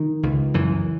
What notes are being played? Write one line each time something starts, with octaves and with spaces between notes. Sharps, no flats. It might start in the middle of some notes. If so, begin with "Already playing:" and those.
Already playing: D#3
C#2
F#2 E3